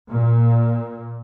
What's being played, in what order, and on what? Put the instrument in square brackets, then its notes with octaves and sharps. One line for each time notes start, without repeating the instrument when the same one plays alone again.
[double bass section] A#2